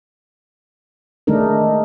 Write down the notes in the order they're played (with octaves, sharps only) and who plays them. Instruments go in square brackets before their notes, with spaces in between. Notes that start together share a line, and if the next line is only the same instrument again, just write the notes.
[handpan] D#3 G#3 A3 D4 D#4 A#4